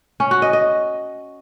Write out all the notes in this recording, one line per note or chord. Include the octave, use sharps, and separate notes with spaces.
C#4
F#4
D#5
D#5